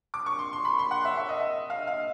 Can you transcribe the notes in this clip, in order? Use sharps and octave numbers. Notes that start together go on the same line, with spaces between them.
D6
C#6
C6
C6
B5
C6
F#5
E5
E5
D#5
E5
F5
F5